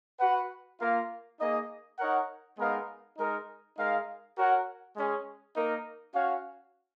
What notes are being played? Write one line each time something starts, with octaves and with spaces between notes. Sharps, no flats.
F#4 B4 F#5
A#3 F4 A#4 F5
A#3 D#4 G#4 D#5
D#4 A#4 C#5 F#5
G#3 B3 D#4 A#4 F5
G#3 D#4 A#4
G#3 D#4 A#4 F5
F#4 A#4 C#5 F#5
G#3 C#4 G#4
A#3 D#4 A#4
C#4 F#4 C#5 F5